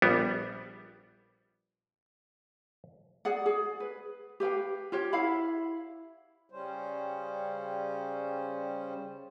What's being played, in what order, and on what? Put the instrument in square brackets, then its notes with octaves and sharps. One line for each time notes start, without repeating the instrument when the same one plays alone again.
[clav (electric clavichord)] A#1 G3 B3
[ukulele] G#4 D5 F#5
G#4
B4
G4 B4 F5 G5
F4 G4 C#5
E4 F5 F#5 B5
[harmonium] C#3 G3 C#4 C5